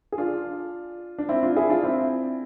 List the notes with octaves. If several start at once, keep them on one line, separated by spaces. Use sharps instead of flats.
G#4
D4 F4
D4
C4 E4
D4 F4
E4 G#4
D4 F4
C4 E4